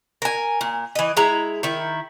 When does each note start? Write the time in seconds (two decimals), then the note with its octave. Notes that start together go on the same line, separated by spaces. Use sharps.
0.22 A#4 G#5
0.61 A#2
0.95 E3 D#5
1.17 G#3 E4 A#5
1.63 D#3 E4